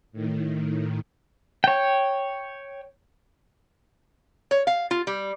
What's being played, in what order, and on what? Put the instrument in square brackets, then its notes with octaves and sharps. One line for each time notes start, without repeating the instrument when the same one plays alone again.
[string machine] A2 D#3
[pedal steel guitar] C#5 G5
[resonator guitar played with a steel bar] C#5
F5
F4
G3